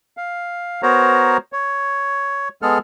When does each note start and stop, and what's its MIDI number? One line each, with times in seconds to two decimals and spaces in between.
0.17 0.82 77
0.83 1.37 59
0.83 1.37 66
0.83 1.37 70
0.83 1.37 72
0.83 1.37 73
0.83 1.37 82
1.53 2.49 73
2.62 2.78 56
2.62 2.78 59
2.62 2.78 68
2.62 2.78 69
2.62 2.78 89